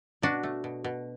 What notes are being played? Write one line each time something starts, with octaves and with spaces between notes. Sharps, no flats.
B2 D4 F#4
A3
B2
B2